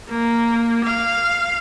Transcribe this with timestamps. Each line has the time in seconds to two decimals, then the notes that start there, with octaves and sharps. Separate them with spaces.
0.10 A#3
0.84 F5